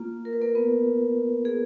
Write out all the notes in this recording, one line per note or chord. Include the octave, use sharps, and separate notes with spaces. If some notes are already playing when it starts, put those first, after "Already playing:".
Already playing: A#3 F4
A#4
B4
A#3 A#4
B3 B4
G#4